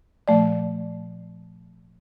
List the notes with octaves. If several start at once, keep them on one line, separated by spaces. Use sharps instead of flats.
A#2 F3 A3 D5